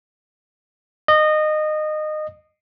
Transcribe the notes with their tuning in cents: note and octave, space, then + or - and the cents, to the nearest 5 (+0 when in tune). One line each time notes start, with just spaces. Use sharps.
D#5 -20